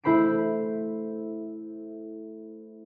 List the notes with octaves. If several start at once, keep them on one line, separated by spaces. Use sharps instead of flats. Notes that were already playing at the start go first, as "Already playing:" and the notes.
A3 E4 C5 B5 C7 D7